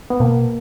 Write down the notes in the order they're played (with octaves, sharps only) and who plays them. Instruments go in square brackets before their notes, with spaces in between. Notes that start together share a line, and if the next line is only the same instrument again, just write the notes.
[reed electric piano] B3
[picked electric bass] B2 [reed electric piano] A#3